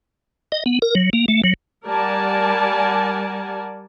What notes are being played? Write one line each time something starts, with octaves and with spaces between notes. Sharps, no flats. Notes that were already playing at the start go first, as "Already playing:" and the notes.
D#5
B3
A#4
F#3
A#3
A3
F#3
G3 A#4 D5 F#5 G#5 A5